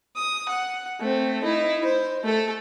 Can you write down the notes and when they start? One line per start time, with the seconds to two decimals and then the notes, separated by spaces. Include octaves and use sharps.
0.16 D#6
0.49 F#5
1.00 A3 C4
1.43 D#4 E4
1.84 C5
2.24 A3 A4